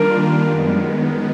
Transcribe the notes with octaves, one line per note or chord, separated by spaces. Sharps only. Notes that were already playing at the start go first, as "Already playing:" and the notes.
Already playing: D#3 G3 A#3 D4 F4 A#4
F#2 D#3 G#3 B3